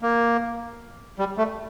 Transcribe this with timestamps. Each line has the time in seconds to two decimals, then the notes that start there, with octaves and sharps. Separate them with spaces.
0.02 A#3
1.19 G3
1.37 A3